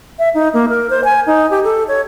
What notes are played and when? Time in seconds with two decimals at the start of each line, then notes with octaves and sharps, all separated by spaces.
0.19 E5
0.35 D#4
0.53 A#3
0.69 A#4
0.90 C5
1.04 G#5
1.27 D#4
1.51 G4
1.64 A4
1.88 C#5